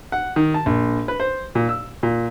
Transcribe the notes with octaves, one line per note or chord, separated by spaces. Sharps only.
F#5
D#3
A5
A#1
B4
C5
A#2
E6
A#2